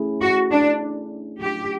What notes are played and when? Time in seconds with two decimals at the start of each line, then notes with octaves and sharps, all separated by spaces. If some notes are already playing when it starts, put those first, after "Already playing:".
Already playing: A3 C#4 E4 G#4
0.21 F#4
0.51 D4
1.40 F#3 A3 D4 F4 G4